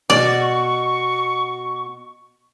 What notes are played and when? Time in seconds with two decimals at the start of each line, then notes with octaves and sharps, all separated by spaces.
0.10 B2 F#4 D5 C#6